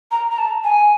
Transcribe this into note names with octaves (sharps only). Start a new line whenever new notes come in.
A#5
A#5
A5
G#5